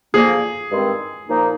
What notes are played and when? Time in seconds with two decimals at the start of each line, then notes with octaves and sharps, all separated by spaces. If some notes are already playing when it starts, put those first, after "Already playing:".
0.14 D3 F3 A#3 G#4
0.71 G2 D#3 G#3 C4
1.28 A#2 F3 A#3 D#4